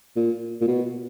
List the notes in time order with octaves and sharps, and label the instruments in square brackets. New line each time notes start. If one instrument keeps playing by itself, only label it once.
[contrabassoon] A#2
A#2
B2